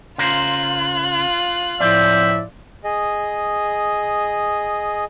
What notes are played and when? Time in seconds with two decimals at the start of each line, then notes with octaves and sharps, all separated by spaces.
0.18 C#3 F4 A#4 C5 F#6
1.80 A2 F3 C4 D5 E5
2.84 G#4 D#5